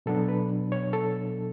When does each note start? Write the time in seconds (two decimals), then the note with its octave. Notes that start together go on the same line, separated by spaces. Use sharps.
0.06 B2 F#3 B3 D4 A4
0.28 B4
0.72 C#5
0.93 A4